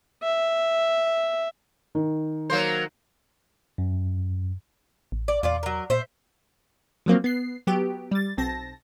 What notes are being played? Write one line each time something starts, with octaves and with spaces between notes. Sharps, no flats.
E5
D#3
F#3 A#3 C5
F#2
A1
D5
E2 A#2 F4 D5
F#3 A#4
A#2 C5 E5
F3 F#3 A#3 C4
B3 C7
F#3 B3 G4
G3 A6
B1 C4 A5 A#6